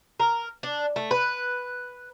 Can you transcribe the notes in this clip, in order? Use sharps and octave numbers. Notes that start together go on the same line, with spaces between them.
A#4
D4
A3
B4